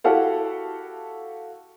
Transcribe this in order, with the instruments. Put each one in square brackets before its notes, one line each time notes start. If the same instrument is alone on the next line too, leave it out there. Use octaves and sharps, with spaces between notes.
[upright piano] E4 F#4 G4 A4 F5 F#5